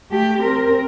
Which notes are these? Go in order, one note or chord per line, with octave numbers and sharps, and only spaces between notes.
A3 G4
C4 A#4